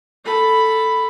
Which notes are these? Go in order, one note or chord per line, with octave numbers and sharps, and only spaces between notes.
A4 B5